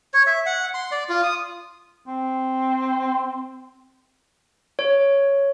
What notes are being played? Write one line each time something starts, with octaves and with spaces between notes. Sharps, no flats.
C#5
E5
F#5
C6
D5
F4
D#6
C4
C#5